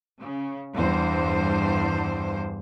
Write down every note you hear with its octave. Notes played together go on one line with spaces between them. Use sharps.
C#3
E2 G2 C5